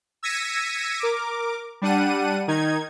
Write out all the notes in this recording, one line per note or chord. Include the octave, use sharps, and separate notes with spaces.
E6 G#6 A#6 B6 C#7 D#7
A#4 D6
G3 D4 F#5 D#7
D#3 D#4 G#6